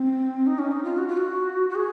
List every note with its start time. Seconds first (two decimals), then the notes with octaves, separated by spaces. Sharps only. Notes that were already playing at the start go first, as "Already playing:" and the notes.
Already playing: C4
0.47 D#4
0.59 C#4
0.71 D#4
0.84 F4
0.98 F#4
1.08 F4
1.17 F#4
1.70 F#4
1.75 G#4